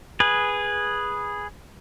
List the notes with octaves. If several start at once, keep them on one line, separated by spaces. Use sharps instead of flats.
G#4 B4